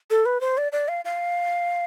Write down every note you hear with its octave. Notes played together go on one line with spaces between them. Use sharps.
A4
B4
C5
D5
D5
F5
F5